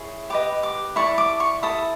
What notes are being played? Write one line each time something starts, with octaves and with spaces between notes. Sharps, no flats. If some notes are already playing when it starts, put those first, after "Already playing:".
Already playing: E4 G#4 C#5
G4 B4 D#5 D6
D6
E4 A4 D5 C#6
D6
C#6
E4 A4 D#6